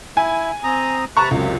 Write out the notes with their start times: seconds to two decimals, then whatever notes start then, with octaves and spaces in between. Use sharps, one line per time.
0.17 E4 G#5
0.64 C4 A#5 D#6
1.17 C3 B4 A5 A#5 C#6
1.31 C#2 F#2 C3